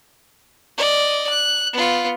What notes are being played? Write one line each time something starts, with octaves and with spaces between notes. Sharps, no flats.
D5 D#5
F#6
B3 F4